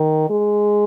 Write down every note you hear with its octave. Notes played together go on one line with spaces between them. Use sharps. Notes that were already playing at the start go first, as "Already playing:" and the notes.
Already playing: D#3
G#3